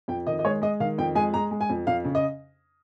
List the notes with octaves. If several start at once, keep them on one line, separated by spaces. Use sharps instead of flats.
F2 G5
D#3 D#5
D#5
G#3 C#5
G#3 D#5
D#3 F5
F2 G5
G#3 G#5
G#3 A#5
G#3
G#5
F2
F2 F5
C#3
D#5